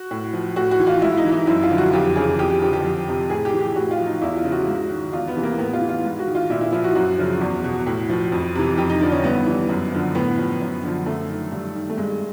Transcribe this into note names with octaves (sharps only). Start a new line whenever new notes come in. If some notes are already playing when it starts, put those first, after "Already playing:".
Already playing: F#4
A2
F3
A2 F#4
F#4
E3
F4
G#2 E4
D#4
E3
D#4
F#2 E4
F4
D3 F3
F#4
F2 G4
C#3 E3 G#4
F2 G4
G4
D3 F3 G4
G4
F2
C3 F3
A2 G#4
G4
E3
G4
A2 F#4
F4
F3
D#4
E2 E4
F4
C#3 F3
F#4
G#2
D#3
E2 F4
B3
C3 E3
A#3
A2 B3
F4
E3
F4
G#2
F#4
D#3
F4
A#2 E4
E4
F3 E4
F#4
F#2 F#4
C#3 F3
E2
B2
A2
F3
F2
C3 E3
F2 G4
D#4
D3 F3 D4
C#4
G2 B3
E3
F#2
D3 F3
A2 B3
F3
F#2
D3 F3
F#2 A3
D#3
G2
D#3
A3
G2 G#3